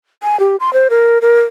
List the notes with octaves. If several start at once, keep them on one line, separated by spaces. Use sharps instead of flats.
G#5
G4
C6
C5
A#4
A#4